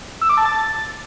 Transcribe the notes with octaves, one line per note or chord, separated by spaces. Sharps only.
E6
D6
A5
A6